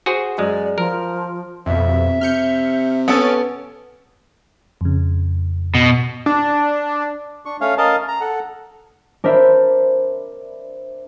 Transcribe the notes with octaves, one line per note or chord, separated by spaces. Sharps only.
F#4 G#4 C5
F#2 G#3 D5
F3 A#4
F2 B2 E5
C3
C3 F6 G6 C#7
B3 C#4 A4 A6 D7
F2 C#3
B2
D4
D4 C#6
A3 C#4 C#5 F5
C#4 A#4 D#5 F5 A5
A#5
A4 F#5
D4 A#4 C5 E5 B5